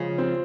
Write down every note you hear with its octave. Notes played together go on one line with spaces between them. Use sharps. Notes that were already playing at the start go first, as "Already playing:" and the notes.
Already playing: C#3 F3 G#3 C#4
C4